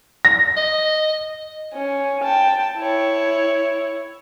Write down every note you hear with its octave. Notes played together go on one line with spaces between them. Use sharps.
A#6
D#5
C#4
G5 A5
E4 C#5